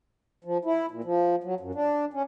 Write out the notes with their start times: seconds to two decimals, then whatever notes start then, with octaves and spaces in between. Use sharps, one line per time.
0.44 F3
0.65 E4
0.91 A#2
1.04 F3
1.44 F#3
1.60 F#2
1.75 D4
2.13 C#4